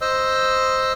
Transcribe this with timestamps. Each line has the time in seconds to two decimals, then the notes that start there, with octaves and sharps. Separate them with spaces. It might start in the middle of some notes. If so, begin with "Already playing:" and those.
0.01 C5 D#5 E6